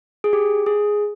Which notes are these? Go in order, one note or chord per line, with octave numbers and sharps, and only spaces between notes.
G#4
G4
G#4